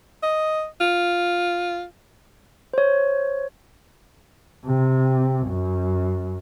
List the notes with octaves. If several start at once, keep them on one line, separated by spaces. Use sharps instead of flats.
D#5
F4
C5 C#5
C3
F#2